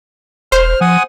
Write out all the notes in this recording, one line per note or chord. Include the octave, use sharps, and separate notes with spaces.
E1 C5 F6
F3 F#5 G#5 D#6